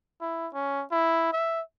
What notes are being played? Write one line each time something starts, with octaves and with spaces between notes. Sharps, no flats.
E4
C#4
E4
E5